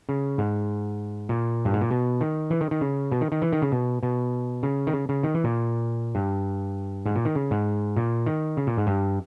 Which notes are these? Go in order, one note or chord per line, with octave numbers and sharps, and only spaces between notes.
C#3
G#2
A#2
G2
G#2
A#2
B2
D#3
E3
D#3
D#3
C#3
B2
D#3
D#3
E3
D#3
C#3
B2
B2
C#3
D#3
C#3
C#3
D#3
E3
A#2
G2
G#2
A#2
D#3
C#3
G#2
A#2
D#3
C#3
A#2
G#2
G2